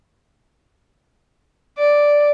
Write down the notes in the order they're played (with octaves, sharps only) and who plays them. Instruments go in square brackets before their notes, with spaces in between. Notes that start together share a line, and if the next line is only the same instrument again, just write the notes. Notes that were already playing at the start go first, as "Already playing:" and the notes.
[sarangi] D5